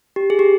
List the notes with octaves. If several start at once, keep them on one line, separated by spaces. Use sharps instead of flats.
G4
G#4
G4